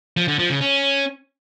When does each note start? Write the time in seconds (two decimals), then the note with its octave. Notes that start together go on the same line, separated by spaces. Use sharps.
0.17 F3
0.28 D3
0.39 F3
0.50 C#3
0.61 C#4